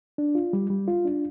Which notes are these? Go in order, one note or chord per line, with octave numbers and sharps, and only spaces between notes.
D4
F4
G3
G3
F4
D4